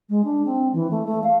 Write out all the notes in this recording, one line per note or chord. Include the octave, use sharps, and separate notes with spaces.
G#3
D4
C4
E3
A3
A3
F5